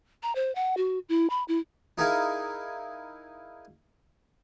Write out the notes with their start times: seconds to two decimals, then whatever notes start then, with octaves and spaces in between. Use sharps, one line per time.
0.23 A#5
0.35 C5
0.55 F#5
0.77 F#4
1.09 E4
1.30 B5
1.48 E4
1.98 D#4 E4 G#4 A#4 F5 G#5